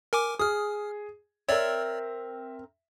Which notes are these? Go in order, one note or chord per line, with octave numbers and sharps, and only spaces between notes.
A#4 G#5 D6
G#4 D#6 F6
C4 A#4 C#5 D5 E5